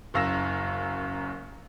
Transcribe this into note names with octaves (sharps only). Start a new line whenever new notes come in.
F#1 F#2 F5 E6 A#6 E7